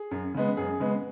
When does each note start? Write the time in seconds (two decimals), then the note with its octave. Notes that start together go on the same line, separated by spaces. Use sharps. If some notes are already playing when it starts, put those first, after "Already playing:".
Already playing: G#4
0.11 F#2
0.34 C#3 G#3 B3
0.57 F#2 G#4
0.80 C#3 G#3 B3